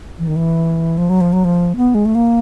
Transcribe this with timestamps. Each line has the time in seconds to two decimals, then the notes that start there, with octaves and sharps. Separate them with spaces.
0.19 E3
0.27 D#3
0.36 E3
0.98 F3
1.10 F#3
1.21 F3
1.33 F#3
1.45 F3
1.76 B3
1.95 G#3
2.06 A3
2.15 A#3